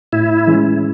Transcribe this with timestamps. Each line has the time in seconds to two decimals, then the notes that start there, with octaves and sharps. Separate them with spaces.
0.13 A2 E4
0.47 E3 G#3 C#4